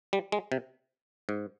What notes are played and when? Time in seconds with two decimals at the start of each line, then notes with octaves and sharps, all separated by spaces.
0.13 G3
0.32 G#3
0.52 C3
1.29 G#2